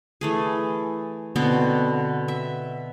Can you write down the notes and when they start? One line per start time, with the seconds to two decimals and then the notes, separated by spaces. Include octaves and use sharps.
0.21 E3 A3 G#4
1.36 B2 D3 B3 C4
2.28 E5